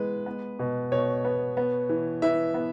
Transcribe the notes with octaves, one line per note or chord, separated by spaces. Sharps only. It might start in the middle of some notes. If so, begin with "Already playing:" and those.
Already playing: E3 G#3 B3 B4
B3
B2
B2 C#5
B3
B3
E3
E3 E5
B3